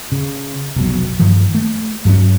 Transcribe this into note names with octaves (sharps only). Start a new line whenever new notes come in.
C#3
F1 B1 B2 F#3
G2 D#3 F3
A3
G2 F#3 A#3 C#4